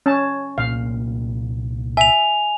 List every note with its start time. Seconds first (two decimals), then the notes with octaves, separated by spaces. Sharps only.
0.06 C#4 A5
0.58 C2 A#2 A#3 F5
1.97 E5 G#5 F7